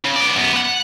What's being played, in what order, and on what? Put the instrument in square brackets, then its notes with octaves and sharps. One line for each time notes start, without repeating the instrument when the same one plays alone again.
[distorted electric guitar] C#3
B3 D5
F#2 B3
B4 F#5